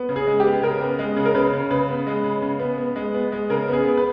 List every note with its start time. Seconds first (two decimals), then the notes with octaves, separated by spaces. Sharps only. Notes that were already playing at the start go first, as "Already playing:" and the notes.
Already playing: B3
0.09 C#3
0.16 G#4
0.27 G#3
0.40 G4
0.45 B3
0.63 C#3 A#4
0.81 B3
0.99 G#3
1.16 C#3
1.25 A#4
1.35 C#3 B4
1.53 C#3
1.71 C#3 B4
1.89 B3
2.07 G#3
2.24 C#3
2.42 C#3
2.60 B3
2.78 B3
2.96 G#3
3.15 B3
3.32 G#3
3.50 C#3 A#4
3.68 B3 G#4
3.85 B3
3.97 B4